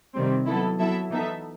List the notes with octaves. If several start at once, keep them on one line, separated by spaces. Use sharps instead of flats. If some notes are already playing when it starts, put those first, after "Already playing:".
C3 D#3 G3 C4
F#3 B3 E4 A4
F#3 B3 E4 A4 E5
E3 B3 D#4 A4 E5